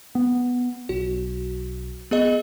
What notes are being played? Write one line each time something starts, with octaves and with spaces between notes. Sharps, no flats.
B3
B1 F#4
B3 G#4 D#5